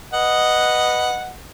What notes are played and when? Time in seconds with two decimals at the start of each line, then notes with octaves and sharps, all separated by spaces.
0.13 B4 D#5 F#5